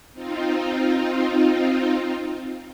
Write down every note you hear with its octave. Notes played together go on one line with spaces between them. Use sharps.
C4 D#4 F4